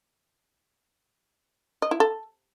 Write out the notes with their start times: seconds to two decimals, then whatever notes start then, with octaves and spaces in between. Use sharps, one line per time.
1.82 D#5
1.91 E4
2.00 A4